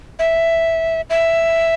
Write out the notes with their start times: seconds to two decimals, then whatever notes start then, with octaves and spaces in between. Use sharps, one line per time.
0.19 E5
1.10 E5